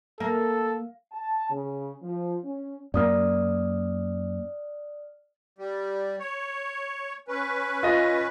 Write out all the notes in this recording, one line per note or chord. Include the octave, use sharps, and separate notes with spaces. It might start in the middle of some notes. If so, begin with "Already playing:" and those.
A#3 A4
A5
C#3
F3
C#4
F#2 A#3 D5 D#6 F6
G3
C#5
C#4 B4
F4 D#5